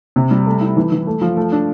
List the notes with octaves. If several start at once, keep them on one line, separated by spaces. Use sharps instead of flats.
C3
G3
A3
E4
E3
E3
A3
F3
A3
D4